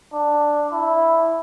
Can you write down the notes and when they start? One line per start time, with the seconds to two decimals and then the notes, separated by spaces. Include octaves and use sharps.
0.13 D4
0.72 E4